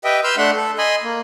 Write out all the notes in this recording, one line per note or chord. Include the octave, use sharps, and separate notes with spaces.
G4 B4 D#5 E5 G5
B4 C6 E6 F6 G6
A3 D4 E5 F#5 C6
A4
D#5 G#5 B5 C6
A#3